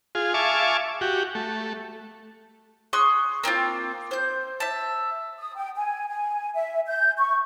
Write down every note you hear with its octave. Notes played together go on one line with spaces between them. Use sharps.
F4 G#4
E5 F5 G#5 A5 C#6 D6
F#4 G4
A3
G#4 C6 C#6 F#6
A#3 C4 D#4 F4
C5 G6
E5 A5
D#6
G5
G#5
G#5
E5
G6
C#6